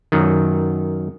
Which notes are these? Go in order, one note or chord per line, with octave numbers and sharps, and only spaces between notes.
F#2 D#3